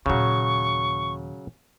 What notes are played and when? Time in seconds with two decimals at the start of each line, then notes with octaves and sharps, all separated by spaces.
0.06 D#2 A#2 C#3 F#3 C#6